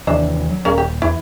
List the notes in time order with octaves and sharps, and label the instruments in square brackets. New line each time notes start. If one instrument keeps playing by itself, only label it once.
[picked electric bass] D#2 C3 E3 [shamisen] D4 E5
[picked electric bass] F#3
[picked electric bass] D#1 [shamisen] C#4 A#4 F5
[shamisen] G4
[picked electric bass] E2 [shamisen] E4